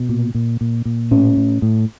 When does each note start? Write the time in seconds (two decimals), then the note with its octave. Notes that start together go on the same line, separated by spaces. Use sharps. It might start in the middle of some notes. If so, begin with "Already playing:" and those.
Already playing: B2
0.09 A#2
0.35 A#2
0.61 A#2
0.85 A#2
1.11 A2 C#4
1.37 A2
1.62 A2